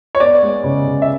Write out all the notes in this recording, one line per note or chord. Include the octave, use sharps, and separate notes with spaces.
C#5
B3 D5
G#3
C#3
C#3
E5